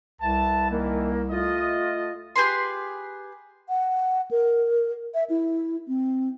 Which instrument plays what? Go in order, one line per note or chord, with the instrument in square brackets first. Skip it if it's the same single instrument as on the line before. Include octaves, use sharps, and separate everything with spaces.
[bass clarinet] C2 [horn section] B4 E5 A5
[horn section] D#3 E3 [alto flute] A#3
[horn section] A3 D#5 [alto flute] F4
[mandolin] G4 G#4 B4 C6
[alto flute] F#5
A#4
E5
E4
C4